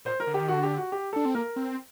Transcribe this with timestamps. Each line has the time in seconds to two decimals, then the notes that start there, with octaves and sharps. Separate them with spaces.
0.05 A#2 C5
0.20 A#4
0.27 D3
0.34 G4
0.40 D#3
0.48 D3 F#4
0.63 G4
0.78 F#4
0.92 G4
1.13 D4 A4
1.25 C4
1.35 A#3 A#4
1.56 C4